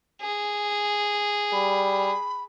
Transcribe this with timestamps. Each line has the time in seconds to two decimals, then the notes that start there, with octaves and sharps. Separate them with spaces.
0.21 G#4
1.53 G3 B5